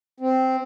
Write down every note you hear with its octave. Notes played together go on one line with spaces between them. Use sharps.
C4